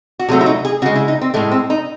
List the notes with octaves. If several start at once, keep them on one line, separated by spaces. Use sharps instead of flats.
F#4
C3 F#3 A3 G#4
E4
D#4
G#4
C#3 G#3 F#4
E4
D#4
C4
A2 G#3 A3
C4
D#4